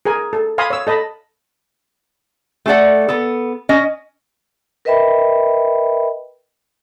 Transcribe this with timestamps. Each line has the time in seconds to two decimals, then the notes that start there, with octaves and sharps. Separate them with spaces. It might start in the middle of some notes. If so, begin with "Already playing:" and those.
0.05 G#4 A#4 G#5
0.33 A4
0.58 F5 G#5 B5 C6 D#6
0.70 C#5 E6
0.87 A4 D#5 A5 B5
2.66 A3 G#4 A4 D5 F#5
3.08 B3 A4
3.69 C#4 D#5
4.85 A#4 B4 D#5 E5 G5 B5